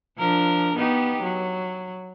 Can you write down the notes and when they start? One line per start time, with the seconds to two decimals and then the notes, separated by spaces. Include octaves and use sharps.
0.18 F3 D4 A#4
0.76 B3 D#4 G4
1.23 F#3